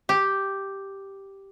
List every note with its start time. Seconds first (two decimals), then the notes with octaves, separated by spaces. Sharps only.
0.09 G4